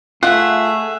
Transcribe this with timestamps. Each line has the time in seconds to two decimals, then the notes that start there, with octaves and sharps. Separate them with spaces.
0.23 A3 F4 G#4 E5 F#5